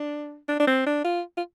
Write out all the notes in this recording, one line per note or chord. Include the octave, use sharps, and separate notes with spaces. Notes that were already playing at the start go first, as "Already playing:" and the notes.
Already playing: D4
D4
D4
C4
D4
F4
F4